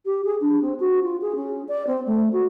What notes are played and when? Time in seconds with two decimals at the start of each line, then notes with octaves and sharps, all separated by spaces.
0.05 G4
0.24 G#4
0.41 D4
0.61 C4
0.80 F#4
1.02 F4
1.21 G#4
1.35 C#4
1.68 D5
1.87 C4
2.06 A3
2.32 F#4